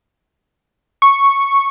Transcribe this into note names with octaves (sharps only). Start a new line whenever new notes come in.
C#6